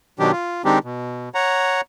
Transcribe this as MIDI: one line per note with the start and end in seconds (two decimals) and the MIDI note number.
0.19 0.32 47
0.19 0.32 51
0.19 0.32 54
0.19 0.32 62
0.19 0.32 67
0.32 0.62 65
0.65 0.79 51
0.65 0.79 56
0.65 0.79 60
0.65 0.79 62
0.65 0.79 63
0.65 0.79 67
0.84 1.29 47
1.34 1.81 73
1.34 1.81 78
1.34 1.81 82